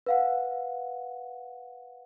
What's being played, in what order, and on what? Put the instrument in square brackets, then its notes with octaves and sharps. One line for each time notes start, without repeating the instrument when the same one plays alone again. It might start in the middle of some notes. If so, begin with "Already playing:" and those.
[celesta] B4 F5 F#5